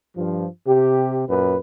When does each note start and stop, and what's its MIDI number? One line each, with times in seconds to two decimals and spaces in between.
0.17 0.47 43
0.17 0.47 53
0.67 1.23 48
0.67 1.23 67
1.28 1.58 42
1.28 1.58 46
1.28 1.58 71